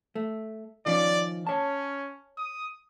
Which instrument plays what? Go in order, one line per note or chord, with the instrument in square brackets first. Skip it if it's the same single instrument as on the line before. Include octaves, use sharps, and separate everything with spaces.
[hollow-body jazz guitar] A3
[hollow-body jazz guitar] D#3 F3 C#4 [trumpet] D5
[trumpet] C#4 [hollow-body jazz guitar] C#5 A5
[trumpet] D#6